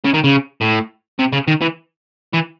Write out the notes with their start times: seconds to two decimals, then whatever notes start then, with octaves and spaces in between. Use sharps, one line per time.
0.05 C#3
0.14 D#3
0.24 C#3
0.61 A2
1.19 C3
1.32 C#3
1.48 D#3
1.61 E3
2.33 E3